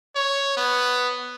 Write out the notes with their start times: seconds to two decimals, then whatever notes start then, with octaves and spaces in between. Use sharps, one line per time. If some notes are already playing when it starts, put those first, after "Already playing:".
0.16 C#5
0.57 B3